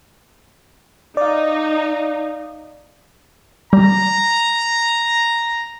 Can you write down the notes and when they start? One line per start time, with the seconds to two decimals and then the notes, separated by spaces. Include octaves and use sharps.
1.17 D#4 D5 F5
3.73 G3 A#5